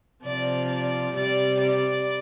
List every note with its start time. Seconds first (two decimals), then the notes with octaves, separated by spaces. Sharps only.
0.23 C3 F3 D5
0.70 D5
1.15 C3 G3 D5
1.60 D5